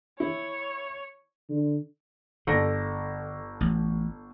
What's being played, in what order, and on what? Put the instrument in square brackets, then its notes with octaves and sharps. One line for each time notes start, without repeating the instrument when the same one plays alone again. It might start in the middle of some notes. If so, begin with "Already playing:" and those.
[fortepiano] E4 [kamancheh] C#5
[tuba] D3
[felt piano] G1 A4 A#6 [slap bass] D3
[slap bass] A1